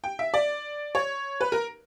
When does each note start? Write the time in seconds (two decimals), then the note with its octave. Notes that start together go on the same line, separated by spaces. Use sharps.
0.04 G5
0.19 E5
0.34 D5
0.95 C#5
1.41 B4
1.52 A#4